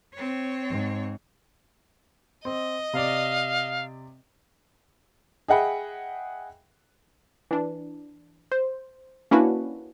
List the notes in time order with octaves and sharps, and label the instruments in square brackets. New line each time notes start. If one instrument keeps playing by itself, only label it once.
[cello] C4 C#5
[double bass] G#2
[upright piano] C4 [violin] D#5
[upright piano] C3 D5 [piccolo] F5
[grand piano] G#4 D#5 E5 F#5 G5 B5
[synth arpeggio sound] E3 D4
C5
A#3 C#4 D4 E4 F#4 B4